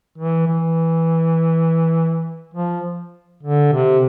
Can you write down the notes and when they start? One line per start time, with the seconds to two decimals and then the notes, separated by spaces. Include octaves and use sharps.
0.18 E3
0.47 E3
2.54 F3
3.43 D3
3.72 C3